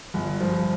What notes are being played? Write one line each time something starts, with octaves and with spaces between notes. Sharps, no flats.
G1
G2 F3